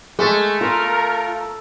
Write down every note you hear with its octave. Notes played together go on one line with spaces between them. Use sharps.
G#3 A3
F4 A#4